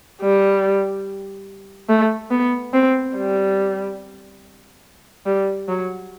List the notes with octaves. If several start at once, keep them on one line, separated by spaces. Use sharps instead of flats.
G3
A3
B3
C4
G3
G3
F#3